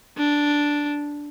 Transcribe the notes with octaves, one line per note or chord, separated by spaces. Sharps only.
D4